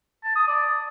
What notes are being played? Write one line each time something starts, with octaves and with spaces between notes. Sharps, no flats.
A5
D#6
D5